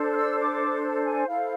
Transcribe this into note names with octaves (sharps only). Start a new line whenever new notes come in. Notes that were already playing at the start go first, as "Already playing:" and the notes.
Already playing: D4 A4 C5
F6
E6
D6
A5
G#5
E4 A4 C5 F5